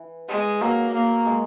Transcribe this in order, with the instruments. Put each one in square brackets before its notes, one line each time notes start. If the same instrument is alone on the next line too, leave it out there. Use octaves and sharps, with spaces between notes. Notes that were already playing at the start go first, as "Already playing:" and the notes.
Already playing: [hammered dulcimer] E3
[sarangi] G#3
[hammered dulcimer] F#3 [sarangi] A#3
[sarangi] A#3
[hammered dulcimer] G#3